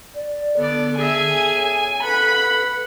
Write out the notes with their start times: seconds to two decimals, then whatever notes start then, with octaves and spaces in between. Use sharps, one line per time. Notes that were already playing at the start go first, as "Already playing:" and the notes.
0.15 D5
0.57 D3 B3 A4 D5
0.97 G#4 A4 E5 G#5
1.54 C#5
2.03 A4 B4 F#5 B5